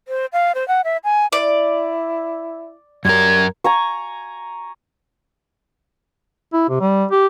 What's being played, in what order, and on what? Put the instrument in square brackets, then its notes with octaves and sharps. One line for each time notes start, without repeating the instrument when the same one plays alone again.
[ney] C5
F5
C5
F#5
E5
G#5
[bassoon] E4 [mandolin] D5
[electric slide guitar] F#2 A#4 [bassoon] G3 [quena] G#6
[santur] G#5 A#5 C#6
[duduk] E4
C3
G3
G4